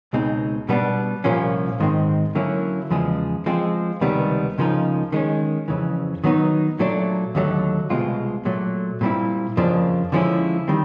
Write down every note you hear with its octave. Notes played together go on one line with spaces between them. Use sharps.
C#2 B2 G#3 C4 D#4
B2 G3 B3 D4
C2 A#2 F3 A#3 C#4
G#2 D#3 G#3 C4
D3 F#3 A#3 C#4 E4
E2 C#3 F3 G#3
F3 G#3 C4
C#2 C3 D#3 G3 B3
C#2 C#3 F3 A#3 D#4
D#3 G#3 C#4
F2 C#3 E3
D#3 F#3 B3 D#4
A#2 F#3 A3 D4
D#2 D3 F#3 A3
C2 B2 G#3 C4 F4
A#2 F#3 A3
A#2 G3 C4 E4
F2 C#3 F3 A#3 D4
D3 F3 G#3 C#4 E4
D#3 G3 C4